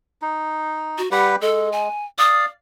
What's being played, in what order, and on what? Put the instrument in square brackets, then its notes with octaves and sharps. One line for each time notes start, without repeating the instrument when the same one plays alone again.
[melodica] D#4
[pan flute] F#4
[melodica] G3 G4 B4 [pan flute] F#5
[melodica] G#3 [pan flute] A4
[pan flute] G#5
[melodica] D5 F5 [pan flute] D#6